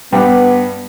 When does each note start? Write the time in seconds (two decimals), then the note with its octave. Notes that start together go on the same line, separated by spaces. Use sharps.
0.12 G2 B3 G4